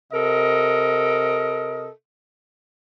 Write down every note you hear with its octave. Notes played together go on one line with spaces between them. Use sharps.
C3 A4 A#4 D#5